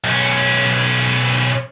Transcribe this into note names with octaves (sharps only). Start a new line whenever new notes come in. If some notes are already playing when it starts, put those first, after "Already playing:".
B1 C#4